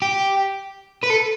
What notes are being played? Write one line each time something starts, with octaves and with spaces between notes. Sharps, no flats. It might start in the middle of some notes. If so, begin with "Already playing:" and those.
G4
B4
A4